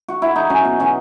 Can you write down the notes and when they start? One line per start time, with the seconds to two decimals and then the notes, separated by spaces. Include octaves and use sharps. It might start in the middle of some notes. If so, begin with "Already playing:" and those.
Already playing: G#4
0.08 F#4
0.22 E4
0.36 D#4
0.50 F#3 C#4
0.65 B2
0.80 B2 C#4